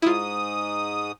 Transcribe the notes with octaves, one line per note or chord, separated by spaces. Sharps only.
G#2 E4 F4 D#6